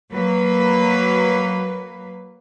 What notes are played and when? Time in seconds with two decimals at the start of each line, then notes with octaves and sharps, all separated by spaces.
0.13 F#3 A#3 B4